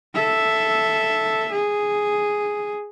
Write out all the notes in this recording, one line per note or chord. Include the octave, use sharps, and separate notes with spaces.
A4 E5
G#4